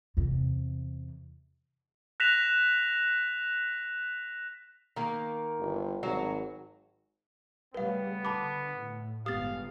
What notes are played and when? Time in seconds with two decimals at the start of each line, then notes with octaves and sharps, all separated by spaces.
0.17 E2 C3
2.20 F#6 A#6 B6 E7 F7
4.96 D#3 A#3
5.59 G1
6.03 G#1 F#3 F#4
7.74 C#3 G3 A3 B3 B4 F5
8.25 D3 A5 B5 D6
8.78 A2
9.26 G1 G#3 B3 G4 F5 D#6 A6